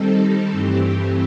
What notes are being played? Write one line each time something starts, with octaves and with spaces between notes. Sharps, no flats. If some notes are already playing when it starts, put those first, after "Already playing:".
Already playing: D#3 G3 C4 D#4 A4
G2 E3 A3 C4 G4